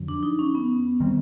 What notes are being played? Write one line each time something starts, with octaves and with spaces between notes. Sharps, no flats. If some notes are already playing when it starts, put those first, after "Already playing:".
Already playing: F2 D3 F#3
D4
D#4
C#4
B3
D#3 G3 C4